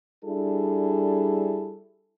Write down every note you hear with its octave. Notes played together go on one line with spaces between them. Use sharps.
G3 D4 E4 G#4 A4